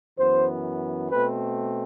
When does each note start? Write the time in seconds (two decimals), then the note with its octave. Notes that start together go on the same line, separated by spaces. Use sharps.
0.18 F#2 E3 B3 C5
1.11 B2 A3 C4 B4